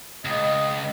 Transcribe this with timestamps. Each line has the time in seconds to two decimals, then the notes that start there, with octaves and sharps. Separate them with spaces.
0.25 C#2 D#5